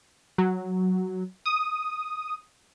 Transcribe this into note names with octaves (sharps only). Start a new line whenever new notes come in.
F#3
D#6